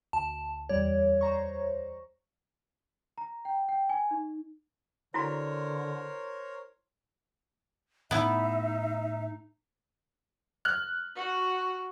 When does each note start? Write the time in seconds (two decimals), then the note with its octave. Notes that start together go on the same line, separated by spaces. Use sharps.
0.13 D2 A5
0.69 E2 G3 C#5 D5
1.21 C5 A#5 C#6
3.18 A#5
3.45 G5
3.69 G5
3.89 G#5
4.11 D#4
5.14 D3 E4 F#4 A#4 C5 C#5 A#5
8.11 A2 B3 D#4 E4 E5
10.65 F6 F#6
11.16 F#4